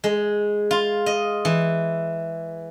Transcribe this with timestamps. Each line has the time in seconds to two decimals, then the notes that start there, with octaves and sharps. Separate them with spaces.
0.04 G#3
0.71 F4
1.06 D#5
1.45 E3